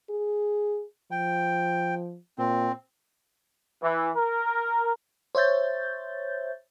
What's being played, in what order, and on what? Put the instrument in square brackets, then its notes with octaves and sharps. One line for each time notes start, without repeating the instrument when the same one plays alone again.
[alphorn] G#4
[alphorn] F3 [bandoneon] G5
[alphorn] A#2 [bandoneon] C4
[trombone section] E3
A#4
[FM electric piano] C5 C#5 E5 G6 A6